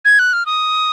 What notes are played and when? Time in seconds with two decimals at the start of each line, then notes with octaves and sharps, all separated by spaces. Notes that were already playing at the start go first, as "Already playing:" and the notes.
0.05 G#6
0.19 F#6
0.33 F6
0.46 D#6